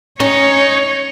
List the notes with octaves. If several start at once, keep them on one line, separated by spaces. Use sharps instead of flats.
C#4 D#4 C#5